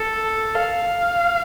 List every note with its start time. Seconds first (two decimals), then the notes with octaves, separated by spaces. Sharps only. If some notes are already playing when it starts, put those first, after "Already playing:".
Already playing: A4
0.55 F5